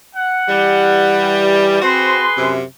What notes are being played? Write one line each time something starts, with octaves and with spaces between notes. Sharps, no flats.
F#5
E3 G3
C4 F#4 G#4 B4 C6
F#2 C3